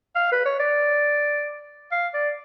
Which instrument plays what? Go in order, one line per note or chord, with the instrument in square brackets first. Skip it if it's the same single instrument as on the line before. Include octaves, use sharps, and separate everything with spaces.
[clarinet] F5
B4
C#5
D5
F5
D5